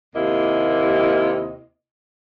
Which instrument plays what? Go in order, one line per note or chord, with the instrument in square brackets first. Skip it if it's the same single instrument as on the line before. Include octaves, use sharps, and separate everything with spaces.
[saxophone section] D#2 C3 A#3 E4 D#5